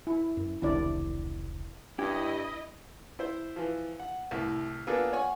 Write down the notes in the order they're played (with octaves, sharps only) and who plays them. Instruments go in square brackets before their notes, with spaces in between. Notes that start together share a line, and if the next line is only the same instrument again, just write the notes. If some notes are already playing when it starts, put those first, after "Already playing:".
[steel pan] E4
[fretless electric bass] F#2
[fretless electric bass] E1 C2 D#3 [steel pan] D4 E4 D5
[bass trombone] G2 [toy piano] D4 [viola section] E4 D#5 [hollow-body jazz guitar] G4
[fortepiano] E4 C5
E3 F3
F#5
C2 A2
A#3 B3 D4 F4 G#4 A4
C#5 F#5 G#5 C#6